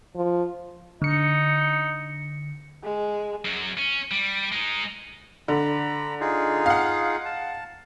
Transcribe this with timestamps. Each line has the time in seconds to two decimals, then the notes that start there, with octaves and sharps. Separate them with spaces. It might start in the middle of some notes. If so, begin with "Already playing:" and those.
0.15 F3
1.02 D3 D#4 C#7
2.84 G#3
3.45 F#2 F#3
3.78 C#4
4.11 G3
4.52 G#3 D#4
5.48 D3 A#5 B5
6.20 D#4 F4 G#4
6.66 F5 F#5
7.25 A5